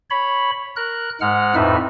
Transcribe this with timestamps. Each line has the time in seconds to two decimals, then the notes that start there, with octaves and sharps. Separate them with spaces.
0.10 C#5 B5
0.76 A#4 F#6
1.21 G#2 G#3 F#5 F6
1.55 F2 A2 D#4 B4 E5